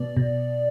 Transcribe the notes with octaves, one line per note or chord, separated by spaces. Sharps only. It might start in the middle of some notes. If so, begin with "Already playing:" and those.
Already playing: B2 B3 D5
B2